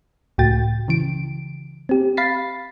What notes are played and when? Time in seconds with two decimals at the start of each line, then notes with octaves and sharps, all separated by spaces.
0.38 C#2 A2 F#4 G5 A6
0.88 C#3 E3 D7
1.89 C4 G4
2.17 F5 B5 A6 B6 C7